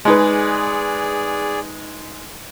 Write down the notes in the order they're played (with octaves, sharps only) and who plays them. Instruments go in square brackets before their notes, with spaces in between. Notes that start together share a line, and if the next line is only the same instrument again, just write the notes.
[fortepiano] G#3 D#4 B4 [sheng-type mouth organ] G#4 D5